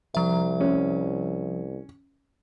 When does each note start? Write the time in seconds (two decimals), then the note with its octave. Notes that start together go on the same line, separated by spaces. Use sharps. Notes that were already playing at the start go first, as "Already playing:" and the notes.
0.15 C2 F3 E5
0.61 C#4